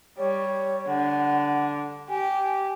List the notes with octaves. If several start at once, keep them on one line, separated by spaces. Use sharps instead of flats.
G3 C#5
D3 F#5
G4 G#5